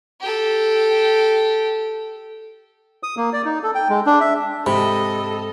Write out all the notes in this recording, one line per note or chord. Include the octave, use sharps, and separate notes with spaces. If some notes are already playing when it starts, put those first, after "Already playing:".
G4 A4
D#6
A#3
D5
D#4
A4
G5
G#3
D4
E5
G#2 C3 A4 D#5 B5